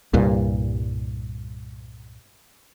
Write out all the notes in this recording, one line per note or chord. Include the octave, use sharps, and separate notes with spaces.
C2 G2 A#2